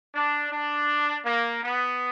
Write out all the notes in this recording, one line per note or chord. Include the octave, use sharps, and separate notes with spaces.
D4
D4
A#3
B3